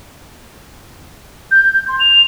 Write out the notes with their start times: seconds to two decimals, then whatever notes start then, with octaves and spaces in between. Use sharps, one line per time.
1.51 G6
1.74 G6
1.88 C6
2.00 F7